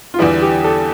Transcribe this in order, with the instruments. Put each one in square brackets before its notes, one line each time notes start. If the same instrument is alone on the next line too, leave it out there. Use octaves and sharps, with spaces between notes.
[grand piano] F4
[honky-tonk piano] E2 D3 G3 B3 [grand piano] E4
[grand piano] G4
A4